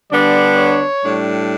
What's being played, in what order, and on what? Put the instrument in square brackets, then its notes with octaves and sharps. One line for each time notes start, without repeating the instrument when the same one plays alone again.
[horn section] D3 G3 B3 D4 D5
C#5
A2 G3 D4